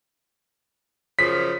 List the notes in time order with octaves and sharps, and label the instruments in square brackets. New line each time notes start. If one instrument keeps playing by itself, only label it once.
[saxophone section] F#2 C#3 F3 [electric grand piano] B6